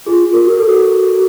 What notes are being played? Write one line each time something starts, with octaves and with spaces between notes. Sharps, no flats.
F4 G#4
F4
A#4
F#4 A#4
A4
F#4